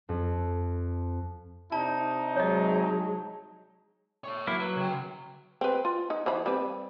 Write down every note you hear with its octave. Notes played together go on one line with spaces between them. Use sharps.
F2
C3 D4 D#4 A5
F#3 G#3 C#5 D#5
A4 C#5
F#3 A#3 E4
F#3 B4
C#3 G5
C4 B4
F4
D#4
E3 C5 B5
G3 C4 B4